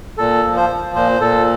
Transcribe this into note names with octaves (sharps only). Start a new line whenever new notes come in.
A#2 A4
F3
C5
F3
A#2 C5
A#2 A4